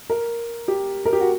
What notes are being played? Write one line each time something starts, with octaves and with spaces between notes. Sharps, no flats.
A#4
G4
A#4
G4
F#4